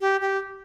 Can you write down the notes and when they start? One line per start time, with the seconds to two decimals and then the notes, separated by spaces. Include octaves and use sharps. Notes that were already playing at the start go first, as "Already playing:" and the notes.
0.01 G4
0.21 G4